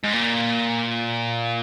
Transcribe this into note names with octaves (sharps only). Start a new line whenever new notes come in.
G#2
A#2